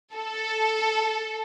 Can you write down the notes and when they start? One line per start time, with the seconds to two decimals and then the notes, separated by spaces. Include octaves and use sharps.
0.15 A4